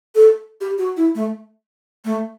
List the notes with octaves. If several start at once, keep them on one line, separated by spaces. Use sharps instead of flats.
A4
G4
F#4
E4
A3
A3